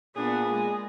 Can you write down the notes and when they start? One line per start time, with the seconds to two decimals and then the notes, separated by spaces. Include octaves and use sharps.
0.16 A#2 B3 D4 G#4
0.53 G#3